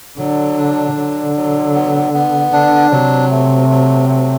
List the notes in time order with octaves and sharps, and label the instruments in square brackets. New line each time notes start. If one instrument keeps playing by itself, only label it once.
[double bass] D3 [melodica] F#3
[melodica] D4
[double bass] D3 [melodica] F#3
[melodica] F#3
B3
B3
[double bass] D3 [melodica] D4
[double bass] C3 [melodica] F#3
[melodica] A3
F#3
A3